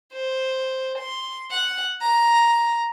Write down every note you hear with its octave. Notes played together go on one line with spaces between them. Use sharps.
C5
C6
F#5
A#5